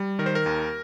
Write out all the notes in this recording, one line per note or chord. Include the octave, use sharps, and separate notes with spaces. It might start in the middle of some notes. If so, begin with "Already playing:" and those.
Already playing: G3
D#3 A#4
C5
A#4
D#2